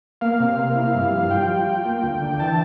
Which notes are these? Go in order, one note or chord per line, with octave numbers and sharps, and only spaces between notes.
A#3 F5
C3
A#3
E4
G2
F3
G3 G5
F4
F4
A#3
D2
D3
E3 A5